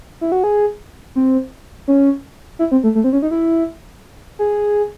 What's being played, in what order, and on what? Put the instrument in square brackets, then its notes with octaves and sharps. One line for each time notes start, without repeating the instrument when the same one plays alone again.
[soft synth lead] E4
F#4
G#4
C4
C#4
E4
C4
A3
A3
C4
C#4
D#4
E4
G#4